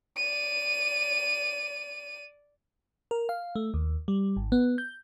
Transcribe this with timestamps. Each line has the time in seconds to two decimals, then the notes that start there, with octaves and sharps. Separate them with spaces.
0.17 D5 D#7
3.11 A#4
3.29 F5
3.55 A3
3.74 D#2
4.08 G3
4.36 G#1
4.52 B3
4.78 G6